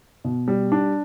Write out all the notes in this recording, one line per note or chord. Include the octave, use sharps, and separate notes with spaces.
B2
G3
D4